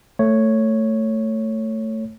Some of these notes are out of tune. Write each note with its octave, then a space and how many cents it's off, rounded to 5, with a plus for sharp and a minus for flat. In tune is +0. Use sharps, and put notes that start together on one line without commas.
A3 +10 C#5 +0